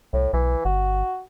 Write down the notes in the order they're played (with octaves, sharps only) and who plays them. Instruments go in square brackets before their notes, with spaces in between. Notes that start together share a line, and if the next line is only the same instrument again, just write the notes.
[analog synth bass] C2 [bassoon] A2
[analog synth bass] B1 [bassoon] E3
[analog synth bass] G1 [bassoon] F#4